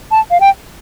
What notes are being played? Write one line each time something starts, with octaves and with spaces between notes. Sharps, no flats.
A5
F5
G5